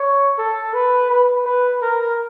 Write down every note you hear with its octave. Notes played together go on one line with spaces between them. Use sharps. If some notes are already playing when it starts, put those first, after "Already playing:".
Already playing: C#5
A4
B4
B4
B4
A#4